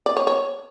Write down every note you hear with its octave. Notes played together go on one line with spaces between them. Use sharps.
D5
C#5
C#5